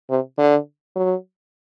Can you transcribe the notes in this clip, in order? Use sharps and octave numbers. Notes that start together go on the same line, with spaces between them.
C3
D3
F#3